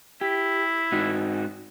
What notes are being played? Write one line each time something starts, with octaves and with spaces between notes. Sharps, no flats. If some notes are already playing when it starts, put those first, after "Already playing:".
E4 G4
G#2 D#4 F#4